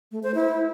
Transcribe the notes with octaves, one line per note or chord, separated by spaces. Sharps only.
A3
C5
E4